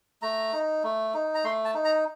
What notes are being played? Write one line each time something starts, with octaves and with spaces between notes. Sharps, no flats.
A3 A#5
D#4
A3
D#4
A#5
A3 C6
A5
D#4
A#5